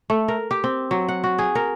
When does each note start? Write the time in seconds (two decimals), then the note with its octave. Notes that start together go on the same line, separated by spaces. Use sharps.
0.10 A3
0.28 A#4
0.51 G4
0.64 C4
0.91 F#3
1.08 F#5
1.24 F#4
1.39 G#4
1.55 A#4